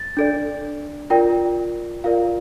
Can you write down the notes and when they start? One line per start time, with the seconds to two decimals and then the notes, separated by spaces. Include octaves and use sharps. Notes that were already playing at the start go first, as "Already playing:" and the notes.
Already playing: A6
0.17 D4 A4 D5
1.10 F4 A#4 D5 G5
2.04 F4 A#4 D5 F5